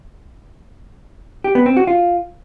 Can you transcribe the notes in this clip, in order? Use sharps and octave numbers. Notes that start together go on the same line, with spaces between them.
G4
B3
C4
F#4
F4